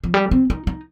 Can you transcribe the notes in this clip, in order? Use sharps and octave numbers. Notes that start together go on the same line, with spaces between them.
F3
G3
C4
D#4
D#4